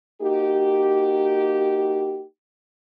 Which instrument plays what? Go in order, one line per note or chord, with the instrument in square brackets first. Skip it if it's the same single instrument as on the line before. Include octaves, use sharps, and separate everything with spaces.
[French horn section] A#3 D#4 F#4 G4